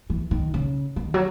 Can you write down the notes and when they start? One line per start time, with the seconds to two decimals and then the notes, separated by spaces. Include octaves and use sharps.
0.10 E3
0.31 D#3
0.54 C#3
0.96 D#3
1.14 F#3